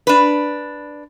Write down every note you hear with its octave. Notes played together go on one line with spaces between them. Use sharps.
D4 B4